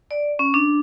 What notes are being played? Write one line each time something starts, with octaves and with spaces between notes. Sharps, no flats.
D5
C#4
D4